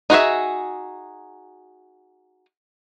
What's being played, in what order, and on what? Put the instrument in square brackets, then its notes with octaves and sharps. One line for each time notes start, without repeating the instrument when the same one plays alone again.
[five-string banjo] D#4 F#4 G#4 E5